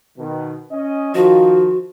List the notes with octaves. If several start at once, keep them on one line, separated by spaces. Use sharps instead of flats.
B2 D#3
C#4 D#5
D#3 F3 F#4